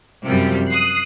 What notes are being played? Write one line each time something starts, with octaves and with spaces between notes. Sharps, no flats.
F#2 C3 F3 G3
D#6 F#6 C7